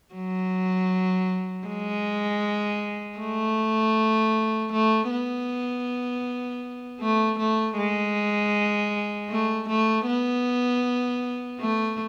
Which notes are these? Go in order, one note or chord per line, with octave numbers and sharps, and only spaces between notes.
F#3
G#3
A3
A3
B3
A3
A3
G#3
A3
A3
B3
A3